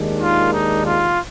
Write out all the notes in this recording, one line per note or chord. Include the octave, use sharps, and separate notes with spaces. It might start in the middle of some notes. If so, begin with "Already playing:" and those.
Already playing: D#2 D#3 G#3 D4
F4
D#4
F4